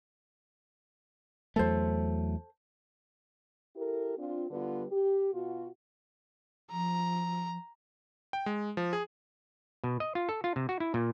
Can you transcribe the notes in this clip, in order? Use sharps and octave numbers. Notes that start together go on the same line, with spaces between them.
E2 F#3 A3 A4 C5
E4 G4 A4 A#4
C4 D4 F4
D3 G3 B3 F4 B4
G4
B2 F4 F#4
F3 A#5
G5
G#3
F3
G#4
B2
D#5
F4
A4
F4
C3
F#4
E4
A#2